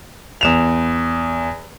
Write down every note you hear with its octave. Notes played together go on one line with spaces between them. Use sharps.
E2 E7 F7